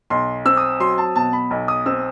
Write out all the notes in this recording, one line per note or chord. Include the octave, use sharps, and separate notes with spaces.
B1 C6
C4 E6
D#6
F#3 C6
A5
B2 A5
B5
B1
D#6
C4 E6